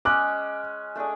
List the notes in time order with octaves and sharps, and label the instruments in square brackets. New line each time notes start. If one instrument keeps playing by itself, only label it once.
[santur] G#3 C#4 G#4 [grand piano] D6 F#6
[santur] A3 D4 G#4